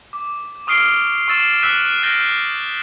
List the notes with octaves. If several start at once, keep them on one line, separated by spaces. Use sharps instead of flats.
D6
C#6 D#6 F6 C7 D7 G7
C#6 E6 A6 E7
E6 F#6 B6 D#7
F6 G6 A6 A#6 D7 G7